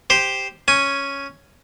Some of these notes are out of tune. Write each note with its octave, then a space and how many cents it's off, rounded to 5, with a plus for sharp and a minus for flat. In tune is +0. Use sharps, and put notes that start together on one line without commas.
G4 +0 C5 +0
C#4 +0 G#5 +0